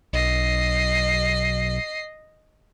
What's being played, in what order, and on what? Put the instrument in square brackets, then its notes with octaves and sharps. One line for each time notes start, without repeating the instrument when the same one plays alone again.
[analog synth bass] B1 [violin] D#5 C7